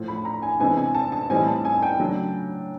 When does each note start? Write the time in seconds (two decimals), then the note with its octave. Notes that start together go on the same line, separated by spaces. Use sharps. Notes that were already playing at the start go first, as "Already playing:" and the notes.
Already playing: A2 F3 A3
0.08 B5
0.25 A#5
0.42 G#5
0.59 C3 E3 G#3 B3 D4 G#5
0.77 G#5
0.95 A5
1.12 A5
1.30 A2 E3 G3 C4 D#4 G#5
1.47 A5
1.65 G#5
1.82 G5
1.99 C#3 F#3 A3 D4